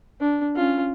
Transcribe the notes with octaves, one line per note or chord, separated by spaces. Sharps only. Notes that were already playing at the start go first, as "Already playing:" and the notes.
D4
C#4 F4